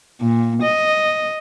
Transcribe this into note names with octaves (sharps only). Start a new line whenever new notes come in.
A#2
D#5